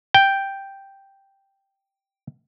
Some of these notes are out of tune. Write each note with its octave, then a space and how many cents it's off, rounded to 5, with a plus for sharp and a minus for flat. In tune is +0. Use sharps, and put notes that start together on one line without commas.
G5 +0